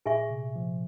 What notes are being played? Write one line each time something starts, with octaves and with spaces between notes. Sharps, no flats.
A#2 G#4 E5 G#5 C#6
C3
F3